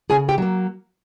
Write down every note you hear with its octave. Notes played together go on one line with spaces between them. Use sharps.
C#3 G#4 G#5
G4 G5
F#3 A#3